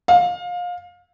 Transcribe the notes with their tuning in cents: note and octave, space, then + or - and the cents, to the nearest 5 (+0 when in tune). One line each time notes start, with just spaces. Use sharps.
F5 +25